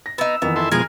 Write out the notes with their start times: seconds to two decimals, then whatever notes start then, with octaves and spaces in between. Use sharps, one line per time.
0.06 A#6
0.18 B3 D#4 E6
0.42 F2 D#3 E3 B3
0.56 E4 A4 E5 C6
0.72 B2 F3 G#3 G#4 A#4 G#5